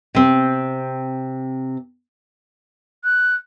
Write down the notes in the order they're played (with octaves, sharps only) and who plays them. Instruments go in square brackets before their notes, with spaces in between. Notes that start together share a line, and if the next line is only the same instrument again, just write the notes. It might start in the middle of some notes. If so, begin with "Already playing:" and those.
[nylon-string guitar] C3 C4
[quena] F#6